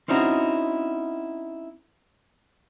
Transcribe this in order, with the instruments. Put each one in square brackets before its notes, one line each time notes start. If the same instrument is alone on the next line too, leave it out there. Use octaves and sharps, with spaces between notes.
[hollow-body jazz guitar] C4 C#4 D#4 E4 F#4